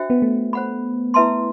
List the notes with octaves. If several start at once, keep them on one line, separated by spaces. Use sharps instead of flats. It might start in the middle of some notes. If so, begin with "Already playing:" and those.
Already playing: D4 F#4 C5 E5 G5
B3
A3
C5 F#5 B5
E4 B4 E5 A5 C6